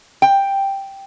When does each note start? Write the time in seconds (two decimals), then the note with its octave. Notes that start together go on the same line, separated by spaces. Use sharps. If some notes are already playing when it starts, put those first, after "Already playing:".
0.22 G5